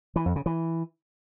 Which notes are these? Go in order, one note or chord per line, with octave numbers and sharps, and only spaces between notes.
E3
F2
C#3
E3